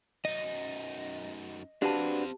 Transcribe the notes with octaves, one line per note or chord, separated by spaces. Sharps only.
F#2 D#4 D#5
C4 D4 F#4 G4 B4 F5 A5